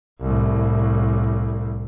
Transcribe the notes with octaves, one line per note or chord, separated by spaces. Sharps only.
C2 A2